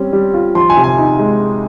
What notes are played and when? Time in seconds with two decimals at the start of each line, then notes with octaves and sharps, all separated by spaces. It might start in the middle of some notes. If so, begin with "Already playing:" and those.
Already playing: G3 C4 C#4
0.13 G3
0.34 F4
0.55 F3 C6
0.70 G#5
0.77 C3
0.84 G#5
0.98 D#4
1.19 G#3